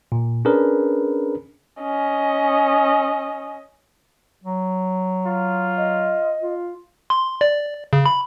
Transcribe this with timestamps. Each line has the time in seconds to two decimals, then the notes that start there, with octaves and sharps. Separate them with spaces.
0.12 A#2
0.45 C#4 D4 G#4 A#4 B4
1.82 C#4 D#5
4.44 F#3
5.26 F4
5.77 D#5
6.41 F4
7.10 C6
7.41 D5
7.93 C#3
8.06 B5